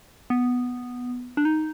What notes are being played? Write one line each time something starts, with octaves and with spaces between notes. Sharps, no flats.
B3
D4
D#4